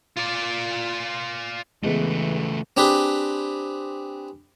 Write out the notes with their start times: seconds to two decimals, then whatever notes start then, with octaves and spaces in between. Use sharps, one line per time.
0.17 F4 D5
1.83 C#3 E3 G#3 A3 B3
2.77 C4 D4 G4 G#4 B4